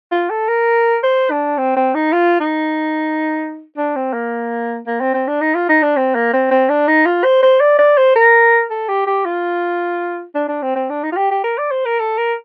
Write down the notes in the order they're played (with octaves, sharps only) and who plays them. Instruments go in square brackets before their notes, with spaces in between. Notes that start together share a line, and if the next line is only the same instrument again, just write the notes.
[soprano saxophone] F4
A4
A#4
C5
D4
C4
C4
D#4
F4
D#4
D4
C4
A#3
A#3
C4
C4
D4
D#4
F4
D#4
D4
C4
A#3
C4
C4
D4
D#4
F4
C5
C5
D5
D5
C5
A#4
A4
G4
G4
F4
D4
D4
C4
C4
D4
D#4
F4
G4
G4
A#4
D5
C5
A#4
A4
A#4